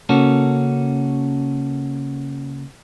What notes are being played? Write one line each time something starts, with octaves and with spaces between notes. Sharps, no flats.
C#3 A#3 C#4 F#4 A4